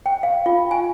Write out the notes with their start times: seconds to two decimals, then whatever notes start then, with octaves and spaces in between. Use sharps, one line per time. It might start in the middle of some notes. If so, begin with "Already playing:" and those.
0.06 G5
0.23 F5
0.46 F4
0.71 G#5